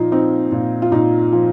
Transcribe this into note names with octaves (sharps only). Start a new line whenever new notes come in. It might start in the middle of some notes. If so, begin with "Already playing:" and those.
Already playing: A#2 F3 D#4 F4
C4 D#4
A#2
F4
A#2 D#4
F3